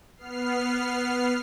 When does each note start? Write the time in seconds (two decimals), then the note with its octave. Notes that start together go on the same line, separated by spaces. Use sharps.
0.17 B3 F6 C7